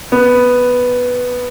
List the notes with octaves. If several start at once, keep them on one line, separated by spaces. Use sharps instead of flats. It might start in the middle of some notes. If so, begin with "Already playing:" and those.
B3